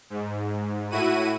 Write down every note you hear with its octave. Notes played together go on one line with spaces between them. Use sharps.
G#2
A2 E4 F#4 D#7